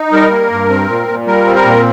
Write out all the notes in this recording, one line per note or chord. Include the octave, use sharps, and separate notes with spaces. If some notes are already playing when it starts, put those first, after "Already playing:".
Already playing: D#4
G3 A#4
A#3
G2
C4
A#2
A#2
G3 A#4
C4
A#4
A#2